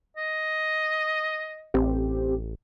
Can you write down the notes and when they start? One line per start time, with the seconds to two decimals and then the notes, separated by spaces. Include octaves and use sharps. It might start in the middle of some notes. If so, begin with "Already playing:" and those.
0.17 D#5
1.74 A1 C4 G4